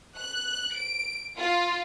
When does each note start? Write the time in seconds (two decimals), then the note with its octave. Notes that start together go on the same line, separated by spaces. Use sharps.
0.16 F#6
0.74 D7
1.37 F4